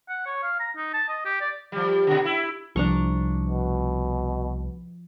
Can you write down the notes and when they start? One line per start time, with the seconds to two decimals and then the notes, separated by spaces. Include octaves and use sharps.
0.09 F#5
0.26 C#5
0.43 F5
0.60 A#5
0.76 D#4
0.94 A5
1.09 D#5
1.25 G4
1.41 D5
1.72 F3 G3
2.07 B2 D3
2.25 E4
2.76 C2 F3 D4 A#5 C#6
3.47 B2